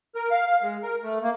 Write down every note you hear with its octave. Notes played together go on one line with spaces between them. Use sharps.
A#4
F5
G#3
A#4
A3
A#3